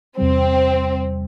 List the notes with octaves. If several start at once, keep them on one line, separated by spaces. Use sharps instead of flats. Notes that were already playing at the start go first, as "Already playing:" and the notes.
E2 C3 G3 C4